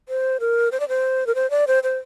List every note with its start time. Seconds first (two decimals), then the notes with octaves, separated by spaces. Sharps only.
0.09 C5
0.40 A#4
0.72 C5
0.80 D5
0.89 C5
1.27 A#4
1.35 C5
1.50 D5
1.67 C5
1.83 C5